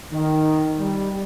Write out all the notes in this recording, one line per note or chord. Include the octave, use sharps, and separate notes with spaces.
D#3
G3